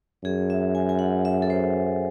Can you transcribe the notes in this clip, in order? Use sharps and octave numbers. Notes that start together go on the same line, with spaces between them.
F#2 G#4
E5
G#5
G#5
F#5
E5
A4
C5